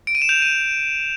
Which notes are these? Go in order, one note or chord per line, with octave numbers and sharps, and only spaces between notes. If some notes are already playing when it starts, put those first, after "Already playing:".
D7
D#7
E7
G6 F7
D#7